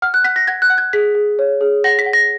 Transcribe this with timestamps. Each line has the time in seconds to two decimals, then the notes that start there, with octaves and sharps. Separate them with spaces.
0.02 F#5 F6
0.14 F#6
0.24 F#5 B6
0.36 A#6
0.47 F#5 G#6
0.62 F#6
0.70 F#5
0.78 G#6
0.93 G#4 B6
1.15 G#4
1.39 C#5
1.61 G#4
1.84 F#5 A#6
1.99 B6
2.06 F#5
2.13 A#6